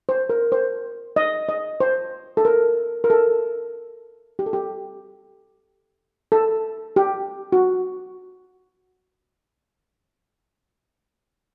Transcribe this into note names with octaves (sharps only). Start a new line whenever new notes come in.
C5
A#4
C5
D#5
D#5
C5
A4
A#4
A#4
A4
G4
A4
G4
A4
G4
F#4